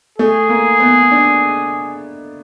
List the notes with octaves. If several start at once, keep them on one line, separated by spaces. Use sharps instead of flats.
A3 G#4
A#3
B3
D4